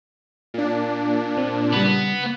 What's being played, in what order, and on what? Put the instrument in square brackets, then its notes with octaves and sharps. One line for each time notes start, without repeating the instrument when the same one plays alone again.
[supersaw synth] A#2 D4
[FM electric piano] C4
[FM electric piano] C#3 G3 [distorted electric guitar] B3